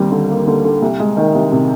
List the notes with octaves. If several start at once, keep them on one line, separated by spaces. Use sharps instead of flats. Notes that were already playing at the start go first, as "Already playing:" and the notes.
Already playing: D#2 G3 C4
D3
A#3
D3
D3
C2
G#3
D#3
C2
C3